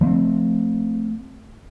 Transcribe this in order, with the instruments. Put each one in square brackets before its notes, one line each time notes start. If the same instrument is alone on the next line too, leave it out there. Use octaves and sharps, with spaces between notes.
[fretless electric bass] F3 A3 B3 C4